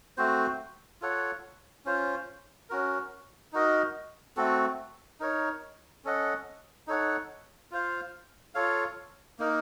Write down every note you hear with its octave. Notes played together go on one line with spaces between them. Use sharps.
A3 C4 F#4 C5
F4 A4 C#5 F#5
C#4 F4 C5
C#4 F#4 A#4
D#4 F#4 A#4 D#5
A3 C4 F#4 A4
D#4 A#4 C#5
C#4 A4 D#5 F#5
D#4 A4 C#5 F#5
F4 C5 F5
F4 A4 C#5 F5
A#3 D#4 A#4